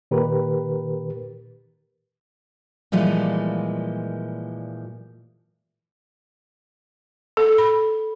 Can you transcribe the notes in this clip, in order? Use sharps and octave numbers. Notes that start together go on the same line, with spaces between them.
A#2 D#3 G4 A#4 B4
A#2 E3 F3 G3 G#3
A4
B5